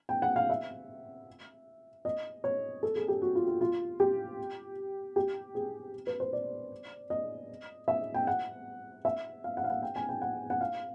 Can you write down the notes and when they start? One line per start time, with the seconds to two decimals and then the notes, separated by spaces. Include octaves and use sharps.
0.09 G5
0.22 F#5
0.36 F5
0.50 E5
2.05 D#5
2.44 C#5
2.83 A4
2.96 G#4
3.08 G4
3.22 F#4
3.35 F4
3.48 F4
3.61 F4
4.00 G4
5.16 G4
5.55 G#4
6.07 B4
6.20 C5
6.33 D5
7.10 D#5
7.88 E5
8.14 G5
8.27 F#5
9.05 E5
9.44 F5
9.57 F#5
9.64 F5
9.70 F#5
9.82 G5
9.96 G#5
10.09 G5
10.22 F#5
10.50 F#5
10.61 F5